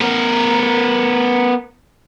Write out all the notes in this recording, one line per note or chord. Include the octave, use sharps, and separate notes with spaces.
B3 A#4